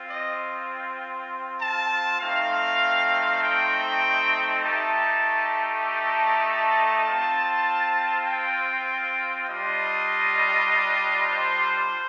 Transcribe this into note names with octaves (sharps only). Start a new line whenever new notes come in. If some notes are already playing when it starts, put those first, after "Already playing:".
Already playing: C4 F4
D#5
A5
A3 C4 D#4 F5
G5
A3 D#4 G4 A5
A5
C4 F4
G5
G3 D4 F4 D#5
C5